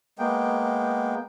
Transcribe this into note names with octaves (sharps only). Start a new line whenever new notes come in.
G#3 A#3 B3 G5